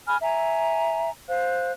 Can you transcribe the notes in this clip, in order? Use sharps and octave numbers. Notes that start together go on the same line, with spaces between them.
G#5 B5 F6
E5 G#5 A#5
C5 F5 F#6